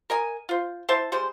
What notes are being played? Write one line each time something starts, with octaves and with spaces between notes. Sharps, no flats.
A#4 D#5 G#5
F4 C5
E4 C5 A5
G3 G#3 C5